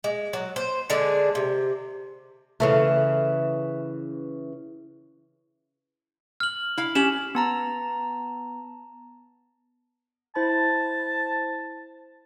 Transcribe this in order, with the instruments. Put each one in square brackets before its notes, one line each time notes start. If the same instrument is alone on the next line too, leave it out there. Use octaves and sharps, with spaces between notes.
[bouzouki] G#3
F#3
C5
D3 G#3 D4 G#4
C3
[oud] C#3 E3 A3
[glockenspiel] F6 F#7
[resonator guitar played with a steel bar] E4 F5
[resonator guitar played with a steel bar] C#4 G4 [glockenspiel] E7 F#7
[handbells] B3 A5 A#5
[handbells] E4 C5 B5 [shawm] A5